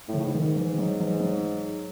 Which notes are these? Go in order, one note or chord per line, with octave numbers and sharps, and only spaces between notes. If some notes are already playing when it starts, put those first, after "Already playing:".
A2
C#3
A2
G#2
D#3
G#2
E3
F#3
E3
F#3